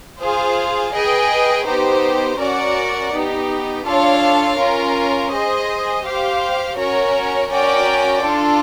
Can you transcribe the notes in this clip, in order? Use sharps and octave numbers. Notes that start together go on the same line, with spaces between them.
F4 G#4 C5 F5
G#4 B4 D#5 G5
B3 D#4 G4 C5
C#4 F#4 A#4 D5 F#5
B3 D#4 G4
D4 F4 A4 C#5 F5
C#4 F4 A#4
G#4 C5 D#5
G4 C5 F5
C#4 F#4 A#4 C#5
C#4 F#4 A#4 D5 G5
D4 F4 A4